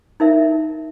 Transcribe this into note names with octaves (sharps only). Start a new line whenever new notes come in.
D#4 A#4 E5